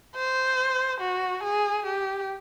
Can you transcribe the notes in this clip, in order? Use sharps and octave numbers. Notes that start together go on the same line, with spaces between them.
C5
F#4
G#4
G4